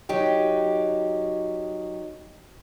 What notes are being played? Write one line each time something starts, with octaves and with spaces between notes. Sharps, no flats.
F#3 D#4 G4